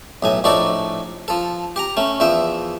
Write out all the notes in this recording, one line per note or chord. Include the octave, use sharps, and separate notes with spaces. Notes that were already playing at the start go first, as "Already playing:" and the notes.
B1 A2 G#5
A#1 A2 D#4 F#4 A4 D5
F3 A4
G4 G5 A#5
A3 C#4
E2 F3 E5 G5